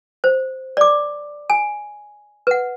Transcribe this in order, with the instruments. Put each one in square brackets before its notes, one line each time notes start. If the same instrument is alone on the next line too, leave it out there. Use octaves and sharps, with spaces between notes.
[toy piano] C5
D5 D6
G#5
B4 F#5